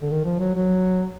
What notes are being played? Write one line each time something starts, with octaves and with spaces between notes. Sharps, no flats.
D3
D#3
F3
F#3
F#3